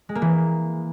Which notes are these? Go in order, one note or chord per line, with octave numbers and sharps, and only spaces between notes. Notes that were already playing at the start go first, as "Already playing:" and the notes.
G#3
A#3
E3